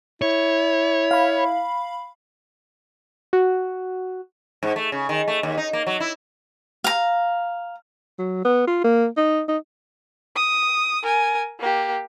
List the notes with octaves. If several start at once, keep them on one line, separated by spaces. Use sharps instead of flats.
E4 C#5
F5 B5
F#4
G#2
A3
C#3
D#3
A3
D#2
D#4
A#3
F#3
E4
F5 A#5
F#3
B3
F4
A#3
D#4
D#4
D#6
A#4 G#5
A#3 G4